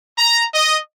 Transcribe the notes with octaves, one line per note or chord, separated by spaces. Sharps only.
A#5
D#5